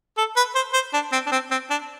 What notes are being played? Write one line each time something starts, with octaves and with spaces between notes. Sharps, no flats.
A4
B4
C5
C5
D4
C4
D4
C4
C4
D4